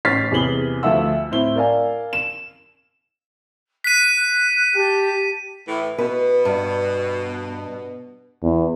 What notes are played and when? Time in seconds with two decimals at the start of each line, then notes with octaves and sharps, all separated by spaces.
0.05 A1 C#5 F6 A6 B6 C7
0.31 E2 C3 G#4 B4 F#7 G7
0.83 D2 F3 A3 E5 F#5 E6
1.31 A2 C4 E4 G7
1.56 A#4 D5 F5 G#5
2.13 E7
3.84 F#6 B6 D#7
4.16 F#6
4.76 G4 A5
5.67 A2 E3 A3
5.98 B2 B4
6.45 G2
8.42 E2